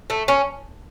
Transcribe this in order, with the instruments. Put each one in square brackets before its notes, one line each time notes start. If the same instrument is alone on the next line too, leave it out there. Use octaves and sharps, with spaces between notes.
[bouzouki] A3
C#4